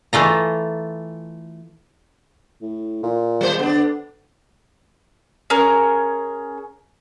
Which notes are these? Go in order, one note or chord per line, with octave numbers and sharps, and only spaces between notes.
E3 A3 F4 A#5
A2
A#2
G3 B3 C5
D3 B3 D4
C#4 G#4 A#4